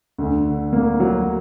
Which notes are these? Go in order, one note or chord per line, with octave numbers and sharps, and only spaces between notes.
D2
D3
A#3
F#3